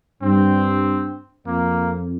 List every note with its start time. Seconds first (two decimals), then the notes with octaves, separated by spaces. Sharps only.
0.23 G2 C4
1.47 F2 A#3